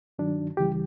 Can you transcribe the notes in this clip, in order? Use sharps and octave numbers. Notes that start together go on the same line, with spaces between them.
G2 D#3 F#3 D4
C#2 C#3 E3 G3 G4